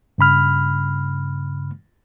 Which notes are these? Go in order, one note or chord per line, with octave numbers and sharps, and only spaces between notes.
G2 C#3 B5 F6